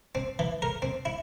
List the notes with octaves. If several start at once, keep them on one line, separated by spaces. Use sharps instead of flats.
C4
E3
A#4
C4
E4